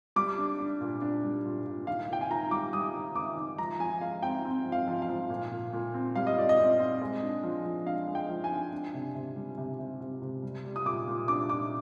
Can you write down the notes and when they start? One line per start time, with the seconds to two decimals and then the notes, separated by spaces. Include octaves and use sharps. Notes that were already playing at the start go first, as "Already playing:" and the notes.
0.16 G3 D6
0.38 D4
0.60 D4
0.81 A#2
1.02 D4
1.24 G3
1.45 A#2
1.66 A#2
1.87 D#3 F5
2.09 D#3 G5
2.21 G#5
2.30 D#3 A#5
2.51 G3 D6
2.73 G3 D#6
2.94 D#3
3.15 D#3 D6
3.37 D#3
3.58 F3 A#5
3.80 F3 G#5
4.01 G#3 F5
4.23 C4 G5
4.45 C4
4.65 F3
4.72 F5
4.88 F3
5.02 F5
5.09 F3
5.30 A#2
5.51 A#2
5.73 A#2
5.94 C4
6.15 G3 F5
6.27 D#5
6.37 A#2 D5
6.49 D#5
6.59 C4
6.79 C4
7.02 G#3
7.23 D4
7.44 F3
7.65 F3
7.86 D4 F5
8.08 G#3
8.15 G5
8.30 F3
8.44 G#5
8.51 D4
8.73 D4
8.94 C3
9.15 C3
9.36 G3
9.58 C3
9.79 C3
10.00 C3
10.22 C3
10.43 G3
10.65 G3
10.76 D#6
10.85 A#2 D6
11.08 A#2
11.28 D4 D6
11.49 A#2 D6